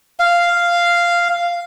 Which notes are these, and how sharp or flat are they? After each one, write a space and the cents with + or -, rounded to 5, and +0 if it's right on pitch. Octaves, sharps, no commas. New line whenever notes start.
F5 -5